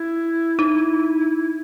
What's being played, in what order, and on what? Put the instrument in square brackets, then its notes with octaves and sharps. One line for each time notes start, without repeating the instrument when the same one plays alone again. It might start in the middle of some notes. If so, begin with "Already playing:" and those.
Already playing: [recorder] E4
[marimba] D#4